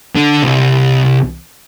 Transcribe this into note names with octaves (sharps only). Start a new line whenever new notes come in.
D3
C2